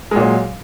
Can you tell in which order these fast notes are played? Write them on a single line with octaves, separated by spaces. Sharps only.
G#3 A#2 F#3